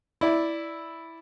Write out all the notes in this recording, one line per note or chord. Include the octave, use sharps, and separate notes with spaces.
E4 D5